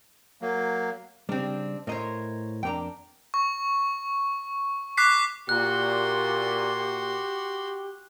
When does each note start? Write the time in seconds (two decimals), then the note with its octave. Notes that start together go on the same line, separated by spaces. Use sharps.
0.42 F#3 A#3
1.29 C#3 G3 C4 D4
1.87 A2 A#4 C5 C#5 D#5
2.63 F2 A#3 D4 G5 A#5
3.34 C#6
4.97 D6 F#6 B6 C7
5.49 A#2 F#4 G4 C6 F#6